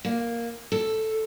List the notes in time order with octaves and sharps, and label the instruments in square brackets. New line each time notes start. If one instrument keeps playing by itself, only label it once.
[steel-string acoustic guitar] A#3
A4